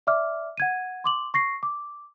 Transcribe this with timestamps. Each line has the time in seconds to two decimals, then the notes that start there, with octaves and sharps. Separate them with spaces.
0.07 D5 E5 D6 F6
0.57 F#5 G#6 D#7
1.04 C6 D6 F#7
1.34 C#6 A#6 C7
1.63 D6